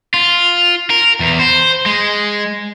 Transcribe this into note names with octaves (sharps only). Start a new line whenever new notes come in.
F4
A#4
E2
C5
G#3